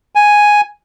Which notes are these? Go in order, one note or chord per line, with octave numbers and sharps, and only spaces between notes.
G#5